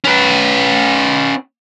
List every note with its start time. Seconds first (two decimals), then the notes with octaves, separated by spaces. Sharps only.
0.04 C#4 B4